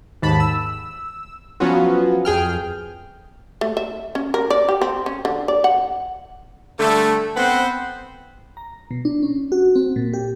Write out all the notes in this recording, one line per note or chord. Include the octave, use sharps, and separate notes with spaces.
D#2 G#2 A5 B5
E6
F3 F#3 B3 C#4 F4 F#4
F2 G#4 G5 F6
A3
E5
C#4
A#4
D5
G4
C4
C#4
D3
D5
F#5
D3 G3 A3
B3 C4 B4 C5 F#5
A#5
B2
D4
C#4
F#4
C4
A#2
G4